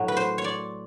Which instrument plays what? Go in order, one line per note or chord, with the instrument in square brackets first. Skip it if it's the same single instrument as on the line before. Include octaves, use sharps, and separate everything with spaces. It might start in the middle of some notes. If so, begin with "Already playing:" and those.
Already playing: [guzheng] A2 F#3
B4
C5
C#5
D5